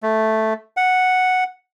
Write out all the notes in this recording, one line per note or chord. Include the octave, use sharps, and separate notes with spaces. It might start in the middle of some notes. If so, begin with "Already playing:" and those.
A3
F#5